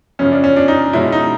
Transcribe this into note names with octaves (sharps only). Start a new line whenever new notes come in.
F#2 C#3 F3 C#4
D4
C#4
D4
D#4
B2 G#3 C#4 E4
D#4